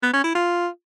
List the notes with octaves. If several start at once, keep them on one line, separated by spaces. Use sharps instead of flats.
B3
C#4
E4
F4